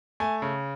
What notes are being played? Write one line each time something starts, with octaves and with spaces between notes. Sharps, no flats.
A3 G#5
C#3